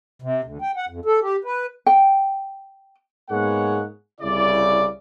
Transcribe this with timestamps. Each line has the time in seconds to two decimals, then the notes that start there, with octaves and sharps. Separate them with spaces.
0.22 C3
0.44 D2
0.62 G5
0.77 F#5
0.89 F2
1.05 A4
1.22 G4
1.44 B4
1.86 G5
3.30 G#2 G#3 A#3 B3 C#5 F#5
4.21 C2 C#3 E4 D5